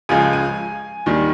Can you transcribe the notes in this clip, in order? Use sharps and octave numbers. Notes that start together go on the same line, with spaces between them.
C#2 C#3 F3 G#3 G#5
G#5
D#2 D#3 G3